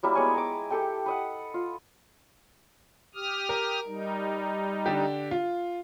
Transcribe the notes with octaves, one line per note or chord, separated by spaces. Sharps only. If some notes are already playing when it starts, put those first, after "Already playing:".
F#3 G3 A#3 E4
G#3 B3 C#5 G#5
A#5 D6
G4 A4 G5
B4 D#5 F#5
F4
G4 D#6 F6
A#4
G3 D#4
D3 D4 G4
F4